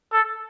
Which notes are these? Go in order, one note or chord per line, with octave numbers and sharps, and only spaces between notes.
A4